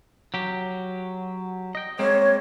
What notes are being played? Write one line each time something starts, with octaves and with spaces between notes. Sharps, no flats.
F#3 G4
D#5 G5
G#3 A#3 C4 C#5